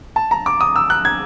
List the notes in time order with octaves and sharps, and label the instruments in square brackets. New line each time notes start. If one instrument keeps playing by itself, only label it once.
[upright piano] A5
A#5
D6
D#6
E6
F#6
G#6